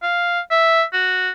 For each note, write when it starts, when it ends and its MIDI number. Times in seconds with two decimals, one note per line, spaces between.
0.02 0.40 77
0.51 0.83 76
0.93 1.30 66